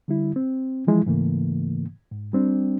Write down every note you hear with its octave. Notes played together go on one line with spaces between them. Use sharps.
D3 G3 E4
C4
E3 F3 G#3 E4
G#2 C#3 E3 A3 A#3
G#2
G3 C4 D4